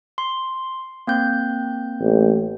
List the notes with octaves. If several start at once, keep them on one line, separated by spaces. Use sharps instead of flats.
C6
A#3 C4 G6
A1